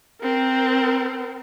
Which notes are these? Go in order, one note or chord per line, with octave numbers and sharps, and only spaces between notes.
C4 A#4